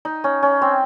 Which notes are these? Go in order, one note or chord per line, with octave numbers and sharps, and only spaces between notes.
D#4
C#4
C#4
C4